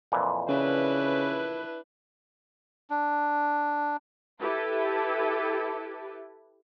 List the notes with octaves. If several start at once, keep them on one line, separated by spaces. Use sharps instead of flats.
F2 A#2 E3
C#3 D4 E4 B4
D4
E4 G4 A4 B4